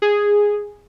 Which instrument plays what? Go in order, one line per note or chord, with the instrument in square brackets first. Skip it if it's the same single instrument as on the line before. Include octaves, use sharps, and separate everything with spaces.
[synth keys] G#4